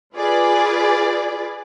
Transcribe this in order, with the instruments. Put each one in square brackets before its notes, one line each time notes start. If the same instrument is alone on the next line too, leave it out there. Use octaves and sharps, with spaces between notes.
[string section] F4 G#4 B4 D5